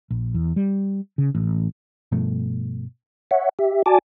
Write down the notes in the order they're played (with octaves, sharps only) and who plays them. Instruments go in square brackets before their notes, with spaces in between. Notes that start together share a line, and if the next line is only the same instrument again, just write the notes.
[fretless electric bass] A#1
E2
G3
C#3
A1
[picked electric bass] G2 B2 F3 A3
[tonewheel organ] C#5 E5 F#5
G4 E5
F#4 D5 G#5 A5 D6